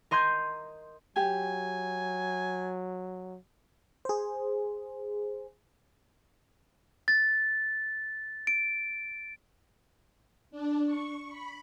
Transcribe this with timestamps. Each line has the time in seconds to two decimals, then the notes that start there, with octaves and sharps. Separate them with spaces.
0.11 A#4 D#5 C6 G6 G#6
1.16 F#3 G4 G#5
4.05 G#4 C5
7.08 A6
8.47 D7
10.51 D4
10.85 C#6
11.29 B5